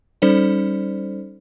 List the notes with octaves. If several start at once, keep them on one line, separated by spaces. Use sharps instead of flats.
G3 C#4 D#4 A4 C5 D5